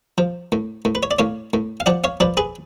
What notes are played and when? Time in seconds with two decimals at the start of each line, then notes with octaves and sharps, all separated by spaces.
0.18 F3
0.52 A2
0.85 A2
0.95 B4
1.03 C#5
1.11 D5
1.19 A2 C#5 F5
1.54 A2
1.80 F5
1.86 F3 D5 F#5
2.04 C#5 F5
2.20 F3 B4 D5
2.37 G#4 B4